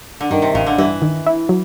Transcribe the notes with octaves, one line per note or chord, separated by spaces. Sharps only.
D3
G2 D#3
C3
A1 C#3
D3
G2 E3
D#3
E4
F#3